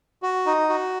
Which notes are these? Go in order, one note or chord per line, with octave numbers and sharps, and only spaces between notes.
F#4
D#4
F#4